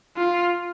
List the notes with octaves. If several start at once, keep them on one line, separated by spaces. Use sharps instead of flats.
F4